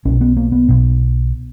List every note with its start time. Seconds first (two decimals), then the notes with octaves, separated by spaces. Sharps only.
0.05 B1 B2 C#4
0.21 B3
0.37 A#3
0.52 B3
0.68 B1 B2